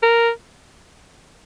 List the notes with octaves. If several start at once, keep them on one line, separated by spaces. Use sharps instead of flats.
A#4